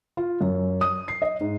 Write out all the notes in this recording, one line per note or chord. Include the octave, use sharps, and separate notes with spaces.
F4
F#2
D#6
C7
D#5
G#2